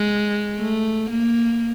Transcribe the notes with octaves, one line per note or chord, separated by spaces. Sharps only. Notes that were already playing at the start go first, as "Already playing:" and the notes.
Already playing: G#3
A3
A#3